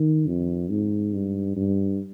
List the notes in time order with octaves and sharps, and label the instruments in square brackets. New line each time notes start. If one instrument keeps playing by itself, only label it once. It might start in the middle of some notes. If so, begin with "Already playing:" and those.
Already playing: [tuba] D#3
F2
G#2
G2
G2